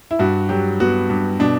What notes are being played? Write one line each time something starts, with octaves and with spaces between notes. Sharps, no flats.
E4
G2 F#4
F#3 G4
B3 F#4
G2
B2 D4